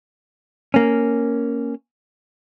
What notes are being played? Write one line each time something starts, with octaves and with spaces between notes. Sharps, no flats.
A#3 C#4